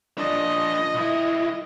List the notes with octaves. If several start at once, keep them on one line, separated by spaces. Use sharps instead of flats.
F3 D4 D#5
B1 E4